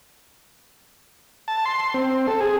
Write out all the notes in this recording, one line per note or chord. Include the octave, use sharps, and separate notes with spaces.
A5
C6
C4
A4
G#4